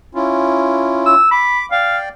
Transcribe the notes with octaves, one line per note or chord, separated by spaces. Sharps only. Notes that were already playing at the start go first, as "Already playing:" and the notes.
C#4 E4 F4
E6
B5 D6
D5 F5 G5